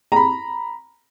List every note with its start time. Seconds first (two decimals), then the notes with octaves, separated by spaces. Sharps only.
0.12 A#5 B5